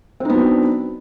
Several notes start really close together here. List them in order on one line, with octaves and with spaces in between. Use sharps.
C4 D#4 B3 F#3 D4